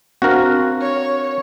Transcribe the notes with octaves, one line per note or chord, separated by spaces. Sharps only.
C4 D4 F#4 A#4 F5
C#5